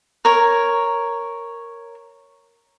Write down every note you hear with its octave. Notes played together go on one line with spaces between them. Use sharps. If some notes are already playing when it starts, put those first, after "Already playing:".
A#4 C#5